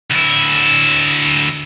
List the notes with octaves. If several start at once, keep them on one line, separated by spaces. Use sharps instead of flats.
D2 E4